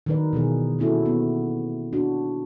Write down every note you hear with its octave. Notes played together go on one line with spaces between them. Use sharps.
D#3 F#3 D#4 A#4 B4 D5
B2 E3 F#3 G#4
A3 A#3 C#4 E4 F#4 A4
B3
D4 F#4